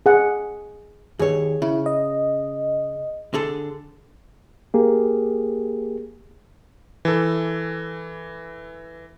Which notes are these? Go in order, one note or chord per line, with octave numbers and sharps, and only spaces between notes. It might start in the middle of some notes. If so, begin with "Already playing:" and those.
G#4 F#5
D#2 G#4 C#5
C#3 E4
D#5
D3 G#4 A4
A#3 G4 G#4
E3 A4